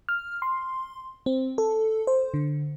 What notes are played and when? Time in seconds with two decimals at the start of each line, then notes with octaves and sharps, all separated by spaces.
0.09 F6
0.42 C6
1.26 C4
1.58 A4
2.07 C5
2.34 D3